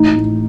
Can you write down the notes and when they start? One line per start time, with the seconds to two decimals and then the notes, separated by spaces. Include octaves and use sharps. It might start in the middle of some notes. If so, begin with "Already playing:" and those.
Already playing: A1 D#4
0.16 A2